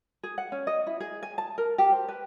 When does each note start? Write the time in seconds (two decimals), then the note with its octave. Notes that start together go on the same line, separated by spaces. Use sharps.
0.23 G#4
0.38 F#5
0.52 C#4
0.67 D#5
0.87 E4
1.00 G#4
1.23 G#5
1.38 A5
1.58 A#4
1.78 G4
1.92 C5
2.08 B4